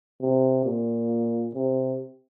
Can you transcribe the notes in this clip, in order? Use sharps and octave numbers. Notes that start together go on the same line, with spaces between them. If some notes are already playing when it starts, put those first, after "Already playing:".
C3
A#2
C3